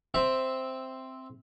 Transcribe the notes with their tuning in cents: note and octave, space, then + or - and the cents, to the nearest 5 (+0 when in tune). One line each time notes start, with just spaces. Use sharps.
C4 +0 E5 -5